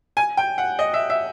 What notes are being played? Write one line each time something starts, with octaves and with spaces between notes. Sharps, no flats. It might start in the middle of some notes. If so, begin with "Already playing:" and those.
G#5
G5
F#5
D#5
E5
E5